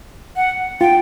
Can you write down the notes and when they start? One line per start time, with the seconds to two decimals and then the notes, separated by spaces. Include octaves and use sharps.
0.36 F#5
0.81 F4 G5